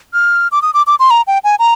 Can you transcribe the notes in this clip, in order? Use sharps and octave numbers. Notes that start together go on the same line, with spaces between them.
F6
D6
D#6
D6
D6
C6
A#5
G5
G#5
A#5